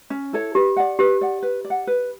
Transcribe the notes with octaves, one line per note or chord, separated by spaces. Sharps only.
C#4
E4 A4 C#5
G4 B4
D5 F#5
G4 B4
D5 F#5
B4
D5
F#5
B4